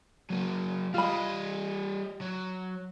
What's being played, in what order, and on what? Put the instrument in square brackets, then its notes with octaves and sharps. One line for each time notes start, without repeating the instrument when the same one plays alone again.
[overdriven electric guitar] F#3 A#3
[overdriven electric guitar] G3 D#5 [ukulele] F4 B5
[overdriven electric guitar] F#3